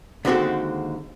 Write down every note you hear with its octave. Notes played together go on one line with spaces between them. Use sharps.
D#2 D3 G#3 C4 F#4 A4